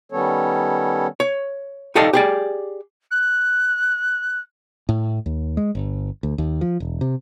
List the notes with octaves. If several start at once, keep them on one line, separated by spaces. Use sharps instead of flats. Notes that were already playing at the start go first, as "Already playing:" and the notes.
D#3 G3 B3 C#4 A4 C#5
C#5
D#4 G4 A4 D5 D#5 F5
G4 G#4 D5
F#6
A2
D#2
G#3
G1
D2
D#2
F3
E1
C3